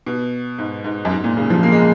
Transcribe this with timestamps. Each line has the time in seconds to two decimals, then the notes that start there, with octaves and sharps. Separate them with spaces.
0.06 B2
0.59 G#2
0.84 G#2
1.05 F#2
1.11 G#2
1.24 A#2
1.37 C#3
1.50 F3
1.63 A#3
1.72 G#3